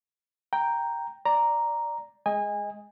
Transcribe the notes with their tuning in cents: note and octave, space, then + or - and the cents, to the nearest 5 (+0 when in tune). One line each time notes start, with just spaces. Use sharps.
G5 +0 A#5 +0
D5 +0 A#5 +0
G#3 +0 D#5 +10 G#5 -25